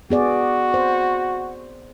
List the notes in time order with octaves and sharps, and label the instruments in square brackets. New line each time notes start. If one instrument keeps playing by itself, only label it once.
[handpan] B3 G#4 D5 [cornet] F#4
[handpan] C5